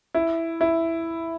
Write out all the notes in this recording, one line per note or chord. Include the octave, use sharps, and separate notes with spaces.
E4
E4